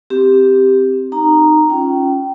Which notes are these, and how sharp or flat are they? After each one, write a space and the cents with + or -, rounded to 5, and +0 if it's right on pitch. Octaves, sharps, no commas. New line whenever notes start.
C4 +0 G4 +0
D#4 -20 A#5 +0
C#4 +0 F4 +0 G5 -20